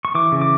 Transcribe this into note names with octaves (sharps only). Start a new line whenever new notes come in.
C#6
E3 D6
C#3
D6